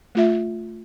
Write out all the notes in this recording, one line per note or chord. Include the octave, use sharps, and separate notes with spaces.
A3 F4 E5